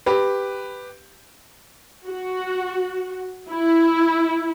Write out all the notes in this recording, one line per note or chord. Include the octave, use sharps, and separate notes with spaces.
G4 B4
F#4
E4